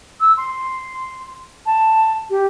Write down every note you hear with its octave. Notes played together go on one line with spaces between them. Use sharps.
E6
C6
A5
G4